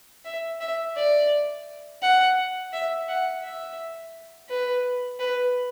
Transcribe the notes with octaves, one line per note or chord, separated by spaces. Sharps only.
E5
E5
D5
F#5
E5
F#5
E5
B4
B4